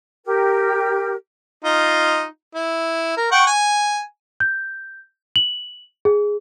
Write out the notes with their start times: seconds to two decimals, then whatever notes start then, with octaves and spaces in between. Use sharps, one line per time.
0.25 G4 A#4
1.64 D#4 F4
2.55 E4
3.17 A#4
3.32 F#5 G5 C#6
3.47 G#5
4.40 G6
5.36 F#7
6.05 G#4